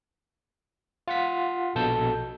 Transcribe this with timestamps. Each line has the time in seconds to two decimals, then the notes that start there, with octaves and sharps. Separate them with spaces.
1.08 F4 F#5 B6
1.75 A#1 B2 A4 E6 G6